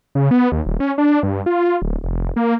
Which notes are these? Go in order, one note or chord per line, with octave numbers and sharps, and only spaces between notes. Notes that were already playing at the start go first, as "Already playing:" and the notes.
C#3
B3
D#2
D#1
C#4
D4
G2
F4
D1
F1
A#3